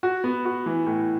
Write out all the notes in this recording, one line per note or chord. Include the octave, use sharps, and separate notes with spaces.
F#4
B3
F#4
E3
A2